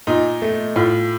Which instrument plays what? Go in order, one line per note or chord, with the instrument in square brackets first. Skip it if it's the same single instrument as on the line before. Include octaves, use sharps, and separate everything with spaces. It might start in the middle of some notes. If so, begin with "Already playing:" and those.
[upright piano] A#2 D#4
A3
A2 F4